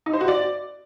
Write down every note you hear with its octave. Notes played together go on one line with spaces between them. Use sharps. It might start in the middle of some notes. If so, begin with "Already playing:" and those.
D#4
C5
F#4
D5